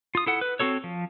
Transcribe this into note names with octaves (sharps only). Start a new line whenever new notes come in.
F4 D#6
E4 A4 F#5
B4
C4 C#4 F#4 A4 C#5
F3